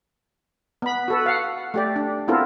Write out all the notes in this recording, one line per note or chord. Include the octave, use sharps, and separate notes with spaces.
B3 B5
F#4 A4 B4
F5 F#5
A3 G4 D5
D4
B3 C4 E4 F4 A4 A#4